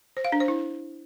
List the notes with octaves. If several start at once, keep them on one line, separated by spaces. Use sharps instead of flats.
C5
F5
D4
C5
E4